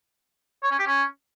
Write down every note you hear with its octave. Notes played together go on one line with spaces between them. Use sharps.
C#5
C#4
G4
C#4